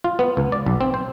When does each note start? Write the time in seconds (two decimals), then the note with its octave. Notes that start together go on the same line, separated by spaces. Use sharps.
0.04 F4
0.19 B3
0.37 C#2
0.52 D5
0.66 B1
0.81 C4
0.94 C5